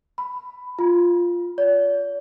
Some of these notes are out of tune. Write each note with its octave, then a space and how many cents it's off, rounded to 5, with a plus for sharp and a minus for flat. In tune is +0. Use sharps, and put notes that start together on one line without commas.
B5 +10
F4 +0
D5 -45